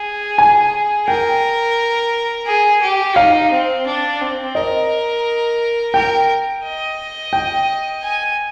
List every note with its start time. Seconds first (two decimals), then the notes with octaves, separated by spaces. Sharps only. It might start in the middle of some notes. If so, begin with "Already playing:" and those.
Already playing: G#4
0.38 G#5
1.07 A#4 G5
2.46 G#4
2.82 G4
3.16 D#4 F5
3.51 C4
3.86 D4
4.21 C4
4.55 A#4 D#5
5.94 A#4 G5
6.64 D#5
7.33 G5
8.03 G#5